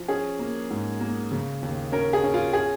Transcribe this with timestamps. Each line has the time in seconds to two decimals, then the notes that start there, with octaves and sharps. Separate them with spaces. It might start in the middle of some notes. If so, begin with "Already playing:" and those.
Already playing: F3
0.08 C#4 G#4
0.39 A#3
0.70 G#2
1.00 A#3
1.31 C#3
1.63 D#2
1.92 C#4 A#4
2.13 G#4
2.24 C#4
2.34 F4
2.53 G#4